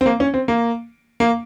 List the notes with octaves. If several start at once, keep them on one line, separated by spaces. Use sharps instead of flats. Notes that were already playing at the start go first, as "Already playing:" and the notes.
C4
A#3
C#4
C4
A#3
A#3